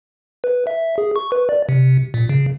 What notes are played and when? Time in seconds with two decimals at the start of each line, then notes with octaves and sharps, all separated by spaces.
0.44 B4
0.67 E5
0.98 G#4
1.16 C#6
1.32 B4
1.49 D5
1.69 C3
2.14 A#2
2.29 C#3